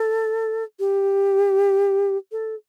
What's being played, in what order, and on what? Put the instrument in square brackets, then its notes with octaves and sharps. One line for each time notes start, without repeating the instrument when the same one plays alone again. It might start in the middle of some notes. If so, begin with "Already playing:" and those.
Already playing: [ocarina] A4
G4
A4